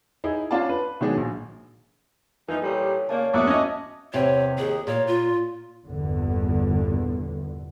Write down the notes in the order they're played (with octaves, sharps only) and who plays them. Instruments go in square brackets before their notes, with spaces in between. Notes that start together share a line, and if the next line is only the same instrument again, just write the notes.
[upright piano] D#4 E4 G#4
C#4 D4 F4 D5 F5 A5
B4
B2 D#3 F#3 G#3 D4 G#4
A#1
[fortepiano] E3 [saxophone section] F3 D#4
[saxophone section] A#2 G3 [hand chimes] A4 C#5
[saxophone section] C#3 A#3 [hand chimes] C#5 D5 A5
[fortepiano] A#1 E2 [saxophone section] F#4 D5 E5 [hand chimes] A5 D#6 C#7
[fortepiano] C#4 D#5
[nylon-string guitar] E2 C3 [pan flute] C#5
[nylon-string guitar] D#2 [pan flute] G#4
[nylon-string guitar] A#2 [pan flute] C#5
[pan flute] F4
[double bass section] G1 E2 G2 A#2 D3